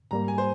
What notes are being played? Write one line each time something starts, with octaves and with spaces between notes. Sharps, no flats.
G#2 G3 A#3 A#5
G#5
C5